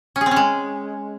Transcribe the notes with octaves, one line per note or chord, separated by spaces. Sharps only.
C#4
G#4
C4
C#4
G#3